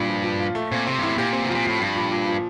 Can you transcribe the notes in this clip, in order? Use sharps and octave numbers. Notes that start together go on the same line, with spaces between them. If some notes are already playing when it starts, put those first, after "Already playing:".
Already playing: G2 A#2
F3
F3
F4
A3
A#2 C4
C3 C4
G2
E4
A2
A#2 G4
C4
C3
F3
A#2
A2 F3
G2 F3
A#2
A#2
F3